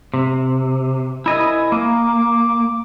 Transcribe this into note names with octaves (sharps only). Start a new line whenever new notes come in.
C3
C2 E4 D#5 G#5
A#3 D6